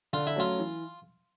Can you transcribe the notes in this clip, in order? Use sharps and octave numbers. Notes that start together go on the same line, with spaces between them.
D3 F4
E4
F#3 A3 C#4 F4
E3